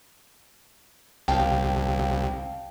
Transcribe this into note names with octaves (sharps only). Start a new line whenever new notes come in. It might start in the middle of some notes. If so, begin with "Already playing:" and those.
C2 F5 G5 A5